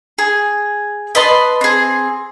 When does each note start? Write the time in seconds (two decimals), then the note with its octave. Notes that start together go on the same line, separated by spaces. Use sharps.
0.18 G#4
1.15 B4 D#5 A5 C6
1.61 C4 G#4